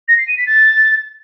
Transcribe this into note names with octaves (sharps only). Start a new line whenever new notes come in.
A#6
C7
D#7
B6
A6